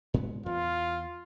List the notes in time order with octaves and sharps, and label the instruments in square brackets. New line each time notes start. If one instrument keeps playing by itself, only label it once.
[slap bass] A2 G#3 B3
[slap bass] E2 [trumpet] F4